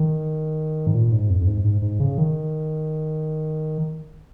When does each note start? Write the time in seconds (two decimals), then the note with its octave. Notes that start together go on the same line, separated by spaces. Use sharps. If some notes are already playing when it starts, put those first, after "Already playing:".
Already playing: D#3
0.87 G#2
0.95 A#2
1.12 G#2
1.30 F2
1.41 F2
1.47 G#2
1.64 G#2
1.82 G#2
1.99 C#3
2.18 D#3